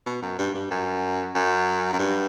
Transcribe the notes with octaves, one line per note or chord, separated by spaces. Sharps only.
B2
F#2
G2
G2
F#2
F#2
F#2
G2